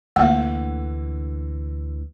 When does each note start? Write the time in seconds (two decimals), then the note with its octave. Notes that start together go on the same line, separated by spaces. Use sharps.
0.16 D2 D3 E3 A3 A#3 F#5